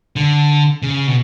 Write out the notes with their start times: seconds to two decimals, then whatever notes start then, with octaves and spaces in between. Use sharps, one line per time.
0.16 D3
0.82 C#3
1.07 B2